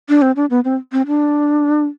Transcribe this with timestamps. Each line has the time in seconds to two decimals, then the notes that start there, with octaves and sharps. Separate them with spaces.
0.09 D4
0.22 C4
0.36 D4
0.50 B3
0.65 C4
0.92 C4
1.07 D4